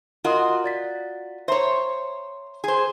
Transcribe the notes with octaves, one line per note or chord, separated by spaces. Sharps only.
F4 F#4 A#4 D#5 C6 D#6
D5 A6 B6
C5 C#5 E5 A#5 C6
G#4 C5